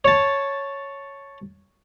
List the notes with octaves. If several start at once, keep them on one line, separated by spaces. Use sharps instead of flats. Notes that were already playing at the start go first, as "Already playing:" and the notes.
C#5 A5